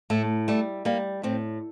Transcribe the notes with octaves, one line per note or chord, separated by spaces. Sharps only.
A2 A3
G3 A3
G3 A#3
A2 C4